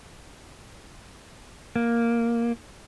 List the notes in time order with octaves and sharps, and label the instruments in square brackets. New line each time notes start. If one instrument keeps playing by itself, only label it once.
[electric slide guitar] A#3